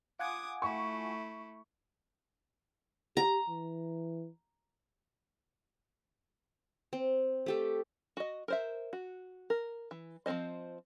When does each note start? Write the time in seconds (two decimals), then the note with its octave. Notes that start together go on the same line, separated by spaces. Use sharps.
0.19 F4 F#5 G#5 D6 D#6 G#6
0.62 A3 E4 C#6
3.17 G4 A#5
3.49 E3
6.93 C4
7.46 A3 G4 A4
8.17 F#4 D#5
8.48 A#4 C5 E5
8.93 F#4
9.50 A#4
9.91 E3
10.26 F3 C4 C#4 C5 D#5